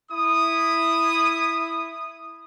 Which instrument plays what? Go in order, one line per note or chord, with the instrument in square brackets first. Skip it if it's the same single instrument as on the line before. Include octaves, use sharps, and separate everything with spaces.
[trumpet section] E4 D#6